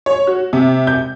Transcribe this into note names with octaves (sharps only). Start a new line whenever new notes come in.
C#5
F#4
C3
G6